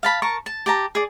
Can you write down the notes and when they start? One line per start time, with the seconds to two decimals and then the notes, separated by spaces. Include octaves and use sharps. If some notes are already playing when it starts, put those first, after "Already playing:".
0.03 F5 A5 B5
0.22 A#4 A5 C#6
0.46 A5
0.66 G4 A5 A#5
0.95 G#4 D5